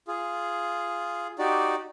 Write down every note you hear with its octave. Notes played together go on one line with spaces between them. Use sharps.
F4 G#4
D#4 F#4 G4 D5